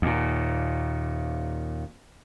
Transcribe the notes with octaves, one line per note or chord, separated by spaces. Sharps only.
D#2 A#2